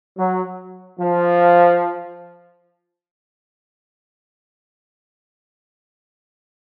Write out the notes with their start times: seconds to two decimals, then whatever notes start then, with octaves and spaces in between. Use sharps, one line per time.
0.17 F#3
0.99 F3